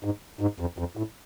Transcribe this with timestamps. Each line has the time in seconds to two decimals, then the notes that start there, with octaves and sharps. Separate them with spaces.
0.05 G#2
0.41 G#2
0.60 F2
0.78 F2
0.97 A2